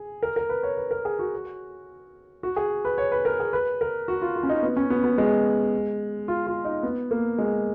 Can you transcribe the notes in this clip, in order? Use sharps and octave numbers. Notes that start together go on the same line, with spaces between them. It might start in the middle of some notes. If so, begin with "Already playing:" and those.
Already playing: G#4
A#4
A#4
B4
C#5
B4
A#4
G#4
F#4
F#4
G#4
B4
C#5
B4
A#4
G#4
B4
A#4
F#4
F4
F4
C#4
D#4
B3
C#4
B3
B3
G#3
F4
F4
D#4
B3
A#3
G#3